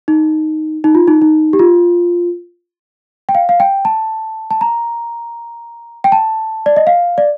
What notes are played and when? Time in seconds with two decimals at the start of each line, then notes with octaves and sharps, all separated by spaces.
0.08 D#4
0.84 D#4
0.95 F4
1.08 D#4
1.22 D#4
1.53 G4
1.59 F4
3.29 G5
3.35 F5
3.49 F5
3.60 G5
3.85 A5
4.51 A5
4.61 A#5
6.04 G5
6.12 A5
6.66 D5
6.76 D#5
6.87 F5
7.18 D5